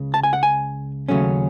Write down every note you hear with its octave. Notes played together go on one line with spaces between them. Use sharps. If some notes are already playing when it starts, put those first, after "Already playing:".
Already playing: C#2 C#3
A5
G#5
F#5
G#5
D#2 C#3 F#3 A3 C#4